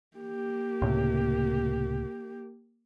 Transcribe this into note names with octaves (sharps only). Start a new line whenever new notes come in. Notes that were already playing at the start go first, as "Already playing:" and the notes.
A#3 G4
C#2 A2 C3